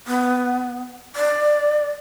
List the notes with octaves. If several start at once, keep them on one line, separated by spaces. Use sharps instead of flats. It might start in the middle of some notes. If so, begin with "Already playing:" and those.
B3
D5